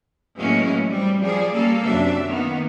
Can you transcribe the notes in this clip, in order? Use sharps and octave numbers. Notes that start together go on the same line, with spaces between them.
A2 E3 F#3 G#3 A#3 C#4
G3 C4
F3 G3 G#4 C5 D5
G3 A#3 C#4 A4
F#2 C3 D4 E5
D#3 A#3 B3